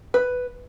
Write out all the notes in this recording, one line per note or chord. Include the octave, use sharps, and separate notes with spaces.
B4